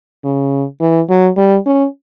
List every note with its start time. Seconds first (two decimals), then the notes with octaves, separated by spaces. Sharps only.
0.24 C#3
0.80 E3
1.09 F#3
1.37 G3
1.66 C#4